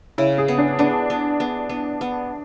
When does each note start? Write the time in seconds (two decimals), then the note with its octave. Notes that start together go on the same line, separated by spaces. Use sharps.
0.18 C#3 E4
0.38 G#4
0.48 B3
0.58 D4
0.79 B3 D4
1.10 B3
1.40 B3
1.69 B3
2.01 B3